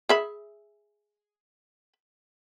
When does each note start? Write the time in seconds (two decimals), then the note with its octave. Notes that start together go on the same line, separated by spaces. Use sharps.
0.09 G#4 E5 B5